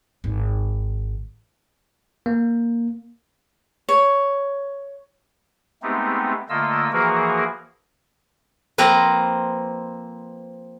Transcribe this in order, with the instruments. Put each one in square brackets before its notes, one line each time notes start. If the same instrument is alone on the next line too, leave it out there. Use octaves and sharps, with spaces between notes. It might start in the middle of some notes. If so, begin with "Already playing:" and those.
[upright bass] G#1
[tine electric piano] A#3
[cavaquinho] C#5
[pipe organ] G#3 A3 B3 C4 D#4 G4
D3 A3 A#3 F4 D#5 E6
E3 F3 A#3 F#4 G#4 A#4
[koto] F3 A#3 C4 B4 A#5